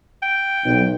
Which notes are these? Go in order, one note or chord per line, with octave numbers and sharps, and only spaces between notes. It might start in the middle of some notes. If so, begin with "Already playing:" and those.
G5
B1